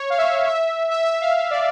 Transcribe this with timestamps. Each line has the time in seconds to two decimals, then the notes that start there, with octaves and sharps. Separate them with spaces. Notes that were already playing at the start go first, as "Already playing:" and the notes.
Already playing: C#5
0.10 F5
0.18 E5
0.47 E5
0.91 E5
1.06 E5
1.21 F5
1.36 E5
1.51 D5